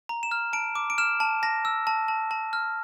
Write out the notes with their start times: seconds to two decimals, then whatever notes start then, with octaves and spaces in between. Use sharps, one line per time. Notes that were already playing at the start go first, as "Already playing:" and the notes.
0.09 A#5
0.23 E7
0.31 F6
0.53 A5 D7
0.75 D6
0.90 D7
0.98 F6 E7
1.20 A5
1.43 A5 A#6
1.65 E6
1.87 A5
2.08 A5
2.31 A5
2.53 F6